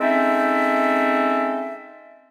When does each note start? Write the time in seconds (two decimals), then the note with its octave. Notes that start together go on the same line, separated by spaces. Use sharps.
0.01 G#3 C4 C#4 D#4 A4 E5